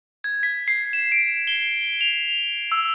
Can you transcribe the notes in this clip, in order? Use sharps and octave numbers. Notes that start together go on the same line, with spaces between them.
G#6
B6
C7
E7
D7
G7
F7
E6